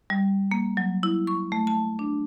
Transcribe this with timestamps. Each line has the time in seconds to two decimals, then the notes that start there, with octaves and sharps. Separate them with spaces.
0.10 G3
0.51 A#3
0.77 F#3
1.03 E4
1.27 C#6
1.52 A3
1.67 A5
1.99 D4